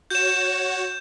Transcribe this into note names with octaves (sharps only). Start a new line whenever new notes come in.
F#4 C#5 G6 E7